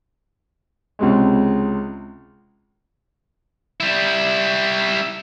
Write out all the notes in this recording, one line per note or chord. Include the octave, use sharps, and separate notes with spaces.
C#2 C3 G#3
G3 E4